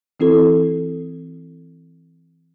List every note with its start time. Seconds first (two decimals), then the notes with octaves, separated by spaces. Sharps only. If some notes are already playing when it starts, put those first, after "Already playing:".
0.20 E3 C4 E4 F#4 A4